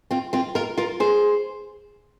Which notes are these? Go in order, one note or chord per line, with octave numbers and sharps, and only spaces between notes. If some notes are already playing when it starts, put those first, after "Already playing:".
C4 F4
C4 F4
F4 A#4
F4 A#4
G#4 C5